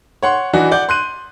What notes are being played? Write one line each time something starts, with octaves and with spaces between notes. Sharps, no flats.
C#5 F#5 C6
E3 D4 D#4 F#4
D5 F#5 G6
C6 F#6 D#7